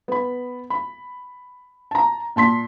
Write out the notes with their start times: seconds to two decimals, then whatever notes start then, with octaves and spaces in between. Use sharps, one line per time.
0.08 B3 B5
0.70 B5
1.91 A5 A#5
2.36 A#2 A5 C6 B6